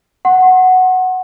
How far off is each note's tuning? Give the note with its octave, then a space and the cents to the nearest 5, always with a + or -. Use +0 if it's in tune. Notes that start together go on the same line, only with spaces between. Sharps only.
F#5 +0 C6 +35